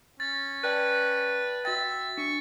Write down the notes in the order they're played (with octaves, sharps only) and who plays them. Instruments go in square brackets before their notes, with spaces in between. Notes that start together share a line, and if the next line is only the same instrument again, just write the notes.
[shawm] C#4 [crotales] A6
[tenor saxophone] B4 [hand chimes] D5 G5 A5
[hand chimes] F#4 G5 [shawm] E5 [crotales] A6
[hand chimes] D4 [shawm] C#6